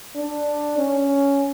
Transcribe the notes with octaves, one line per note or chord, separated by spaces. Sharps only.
D4
C#4